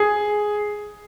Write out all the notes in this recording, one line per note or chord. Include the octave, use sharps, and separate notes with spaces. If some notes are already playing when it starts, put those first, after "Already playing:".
Already playing: G#4